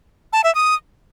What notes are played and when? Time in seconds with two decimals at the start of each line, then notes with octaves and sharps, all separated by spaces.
0.33 A5
0.44 E5
0.55 D#6